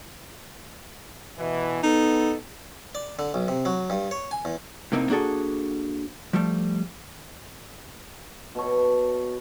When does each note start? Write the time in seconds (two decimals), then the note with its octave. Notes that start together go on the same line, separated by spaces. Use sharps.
1.38 B2 E3
1.83 B3 D#4 A4
2.95 D5
3.19 D3
3.34 B1
3.48 C3
3.65 F#3
3.90 G2
4.11 C#5
4.31 G#5
4.45 E2
4.92 A2 C3 A#3 C4 D#4
5.10 A#3 D4 F#4 G#4 A4 F#5
6.33 F3 G3 A3
8.55 B2 A4 C#5